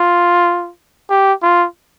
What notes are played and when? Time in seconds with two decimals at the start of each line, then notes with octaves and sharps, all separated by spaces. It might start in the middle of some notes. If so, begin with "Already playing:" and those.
Already playing: F4
1.10 G4
1.42 F4